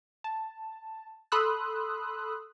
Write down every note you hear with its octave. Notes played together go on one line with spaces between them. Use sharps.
A5
A4 B5 C6 D#6 E6 F#6